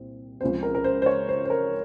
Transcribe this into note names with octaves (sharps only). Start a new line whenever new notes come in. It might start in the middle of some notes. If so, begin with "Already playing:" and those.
Already playing: C2 A#2 C4
C#2 C#3 F3 C4 C5
A#4
A#4
C5
C5
C#5
C5
C5
A#4